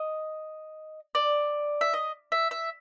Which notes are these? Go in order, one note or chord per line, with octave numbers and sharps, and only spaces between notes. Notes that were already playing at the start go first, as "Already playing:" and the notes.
Already playing: D#5
D5
E5
D#5
E5
E5